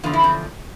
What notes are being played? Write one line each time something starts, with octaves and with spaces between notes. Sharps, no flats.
E2 D3 F3 F4
E4
C4